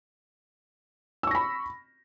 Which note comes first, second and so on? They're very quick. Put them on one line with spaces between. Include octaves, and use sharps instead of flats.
E6 C#6 A#6 B5